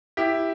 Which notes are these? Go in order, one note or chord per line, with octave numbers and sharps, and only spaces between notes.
E4 G4